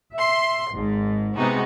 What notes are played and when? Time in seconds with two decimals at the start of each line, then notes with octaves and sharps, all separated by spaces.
0.15 E5 C6
0.74 G#1 G#2
1.35 C3 G#3 B3 D#4 F#4